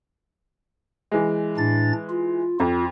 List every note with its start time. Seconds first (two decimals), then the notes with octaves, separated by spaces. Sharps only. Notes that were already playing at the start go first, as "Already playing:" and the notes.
1.12 E3 G#3
1.58 A2 D4 A6
2.10 F4
2.60 F2 F4